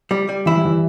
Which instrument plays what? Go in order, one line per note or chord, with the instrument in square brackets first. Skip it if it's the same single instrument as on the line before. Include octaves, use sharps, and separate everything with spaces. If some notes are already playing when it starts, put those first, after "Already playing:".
[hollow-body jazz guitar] G3
G3
[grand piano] E3 [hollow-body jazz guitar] E4
[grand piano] G3
E3